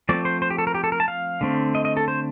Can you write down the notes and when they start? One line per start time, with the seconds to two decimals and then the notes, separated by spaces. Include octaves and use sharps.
0.09 F3 A3 C4 D5
0.25 C5
0.42 C5
0.50 G4
0.58 A4
0.67 A#4
0.75 G4
0.84 A4
0.92 A#4
1.00 A5
1.08 F5
1.41 D3 A3 C4
1.75 D#5
1.85 D#5
1.97 A4
2.08 C5